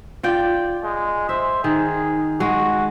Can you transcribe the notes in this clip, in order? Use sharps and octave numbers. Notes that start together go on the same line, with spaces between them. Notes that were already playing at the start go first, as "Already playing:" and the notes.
F4 D5 G5
G#3
C5 E5
D#3 G#4
G#3 F#4